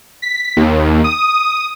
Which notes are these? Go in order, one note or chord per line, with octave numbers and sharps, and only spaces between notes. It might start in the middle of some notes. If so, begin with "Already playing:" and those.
B6
D#2
D#6